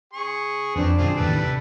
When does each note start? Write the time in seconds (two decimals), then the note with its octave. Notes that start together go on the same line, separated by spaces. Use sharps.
0.13 G#4 C#6
0.75 F2 B3 C4 D4
0.98 F#2 B2 D#3 C4 F4 G#4
1.17 D#2 A2 C#3 G3 A4 B4
1.36 C3